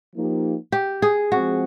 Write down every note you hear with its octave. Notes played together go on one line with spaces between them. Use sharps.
F3 A#3 D#4 G4
G4
G#4
F3 G#3 C4 F#4